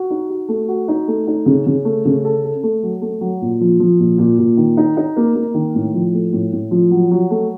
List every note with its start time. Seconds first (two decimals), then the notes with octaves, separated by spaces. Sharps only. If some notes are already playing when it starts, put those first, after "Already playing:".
Already playing: F#4
0.10 D#4
0.30 F#4
0.48 A3
0.68 F#4
0.88 D#4
1.08 A3
1.27 D#4
1.46 C#3
1.66 C#3
1.85 A3
2.05 C#3
2.25 A4
2.44 A4
2.63 A3
2.83 F#3
3.02 A3
3.21 F#3
3.42 A#2
3.61 F3
3.80 F3
3.99 A#2
4.18 A#2
4.38 A#2
4.57 D#3
4.77 D#4
4.97 D#4
5.17 A#3
5.35 A#3
5.54 D#3
5.75 A2
5.94 F3
6.14 A3
6.33 A2
6.53 A2
6.71 F3
6.91 F#3
7.11 F#3
7.31 A3